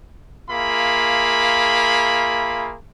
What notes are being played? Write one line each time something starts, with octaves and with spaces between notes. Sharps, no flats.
A#3 F4 G#4 E5 B5